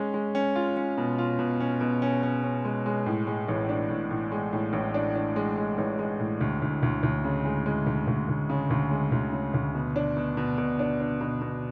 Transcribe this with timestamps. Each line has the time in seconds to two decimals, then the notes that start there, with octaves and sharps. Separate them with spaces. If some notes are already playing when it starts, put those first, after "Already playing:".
Already playing: G#3 C#4
0.14 G#3
0.35 C#4
0.56 F4
0.77 C#4
0.98 B2
1.18 F4
1.39 B2
1.60 C#4
1.81 B2
2.02 C#4
2.23 C#4
2.44 C#4
2.65 G#3
2.86 G#3
3.06 A2
3.27 G#3
3.48 A1
3.69 D4
3.90 A2
4.11 A2
4.32 G#3
4.53 A2
4.73 A1
4.94 D4
5.16 D4
5.36 G#3
5.57 G#3
5.78 A1
5.99 G#3
6.19 A2
6.41 D2
6.62 D2
6.83 D2
7.03 D2
7.24 C#3
7.45 G#3
7.66 G#3
7.87 D2
8.07 D2
8.29 D2
8.50 C#3
8.70 D2
8.91 G#3
9.12 D2
9.33 C#3
9.54 D2
9.75 B2
9.96 D4
10.17 B2
10.37 B2
10.58 B2
10.79 D4
11.00 D4
11.21 B2
11.41 B2